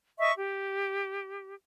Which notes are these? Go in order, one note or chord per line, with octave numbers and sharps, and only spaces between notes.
D#5 E5 C#6
G4